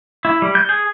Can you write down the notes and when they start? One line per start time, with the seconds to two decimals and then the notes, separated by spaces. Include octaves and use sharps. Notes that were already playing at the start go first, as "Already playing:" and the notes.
0.25 E4
0.42 G3
0.55 G6
0.69 G#4